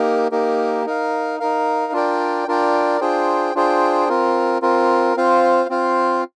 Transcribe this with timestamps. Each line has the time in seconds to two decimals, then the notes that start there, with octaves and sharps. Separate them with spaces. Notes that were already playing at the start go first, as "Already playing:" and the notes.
Already playing: A#3 D#4 G4 A#4
0.32 A#3 D#4 G4 A#4
0.86 D#4 A#4 F5
1.40 D#4 A#4 F5
1.93 D4 F4 A#4 D5 G5
2.48 D4 F4 A#4 D5 G5
3.01 D4 F4 G#4 C5 G5
3.55 D4 F4 G#4 C5 G5
4.09 C4 F4 A#4
4.62 C4 F4 A#4
5.17 C4 F4 C5 F5
5.70 C4 F4 C5 F5